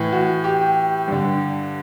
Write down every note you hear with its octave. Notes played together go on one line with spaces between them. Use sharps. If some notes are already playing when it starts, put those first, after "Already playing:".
Already playing: A2 E3
F#4
G4
G2 D3